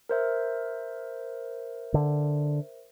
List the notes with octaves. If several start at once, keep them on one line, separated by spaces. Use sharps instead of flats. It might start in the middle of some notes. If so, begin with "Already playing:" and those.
A#4 C5 E5
D3